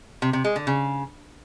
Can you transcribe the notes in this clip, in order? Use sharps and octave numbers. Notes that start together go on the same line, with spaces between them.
C3
C3
G#3
D3
C#3